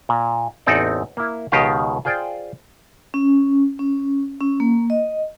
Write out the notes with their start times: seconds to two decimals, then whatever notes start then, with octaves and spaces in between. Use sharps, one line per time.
0.09 A#2
0.67 A1 E2 C4 D#4 A4 D5
1.17 A#3 E4
1.52 C#2 B2 D#3 G4 D#5 F5
2.05 F4 G#4 C5 D5 G5
3.14 C#4
3.79 C#4
4.41 C#4
4.60 A#3
4.90 D#5